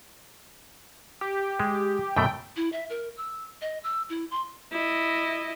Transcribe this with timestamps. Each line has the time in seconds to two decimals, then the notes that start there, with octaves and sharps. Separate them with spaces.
1.21 G4
1.60 G#3
2.16 F#2 B2 A3 G5
2.56 E4
2.73 E5
2.90 A#4
3.17 E6
3.61 D#5
3.84 E6
4.09 E4
4.31 C6
4.72 E4 D#5